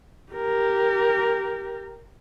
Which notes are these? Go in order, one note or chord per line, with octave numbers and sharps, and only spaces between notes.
G4 A#4